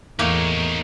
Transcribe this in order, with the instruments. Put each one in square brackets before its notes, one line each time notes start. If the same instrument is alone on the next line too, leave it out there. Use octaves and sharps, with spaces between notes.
[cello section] E2 [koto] A2 A#3 [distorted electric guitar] D#4 C#5